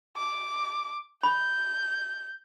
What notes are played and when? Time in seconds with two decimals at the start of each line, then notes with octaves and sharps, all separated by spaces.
0.17 D6
1.23 B5 G6